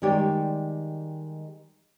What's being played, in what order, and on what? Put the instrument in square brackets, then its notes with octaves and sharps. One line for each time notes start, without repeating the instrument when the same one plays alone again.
[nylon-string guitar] D#3 G3 G#3 G4 C#5 D5